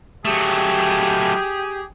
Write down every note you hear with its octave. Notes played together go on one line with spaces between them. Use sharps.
F#3 A3 G4 G#4